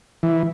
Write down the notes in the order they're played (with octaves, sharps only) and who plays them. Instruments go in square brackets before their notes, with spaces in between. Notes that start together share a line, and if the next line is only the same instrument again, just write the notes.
[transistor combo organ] E3